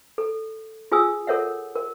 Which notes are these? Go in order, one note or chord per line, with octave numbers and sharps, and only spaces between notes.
A4
F4 G#4 G#5 D#6 E6
A4 A#4 C#5 E5 F#5
A#4